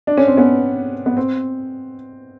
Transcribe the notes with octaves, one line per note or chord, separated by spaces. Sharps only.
D4
C#4
C4
B3 C#4
B3
C4